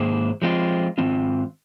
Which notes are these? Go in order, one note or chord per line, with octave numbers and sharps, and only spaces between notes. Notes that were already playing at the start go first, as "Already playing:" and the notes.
Already playing: G#2 D#3 A#3 G#4 C5
F3 G#3 C4 F4
G#2 D#3 C4 F4